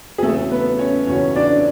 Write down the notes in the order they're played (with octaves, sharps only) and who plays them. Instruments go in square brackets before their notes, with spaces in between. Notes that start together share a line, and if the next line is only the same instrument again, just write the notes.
[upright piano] G#4
E2 C#3 F#3 A3 A4
B3 B4
C#4 C#5
E2 C#3 F#3 C#4 C#5
D4 D5